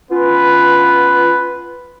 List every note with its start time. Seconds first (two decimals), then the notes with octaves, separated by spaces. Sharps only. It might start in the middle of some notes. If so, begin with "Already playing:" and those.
0.11 B3 C#4 F4 B4